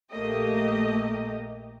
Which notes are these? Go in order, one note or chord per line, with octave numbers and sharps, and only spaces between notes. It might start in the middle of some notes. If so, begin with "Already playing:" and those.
A#1 A3 A#3 G4 D#5